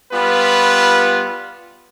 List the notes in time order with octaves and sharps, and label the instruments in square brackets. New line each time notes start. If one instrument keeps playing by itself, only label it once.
[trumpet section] G3 B3 F4 B4